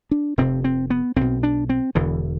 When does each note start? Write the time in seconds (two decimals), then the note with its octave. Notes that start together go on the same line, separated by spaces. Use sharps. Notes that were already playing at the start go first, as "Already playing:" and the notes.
0.11 D4
0.38 F1 F2 C3 C4
0.64 C4
0.90 B3
1.16 B1 B2 C4
1.43 D4
1.69 C4
1.95 E1 E2 D3 E3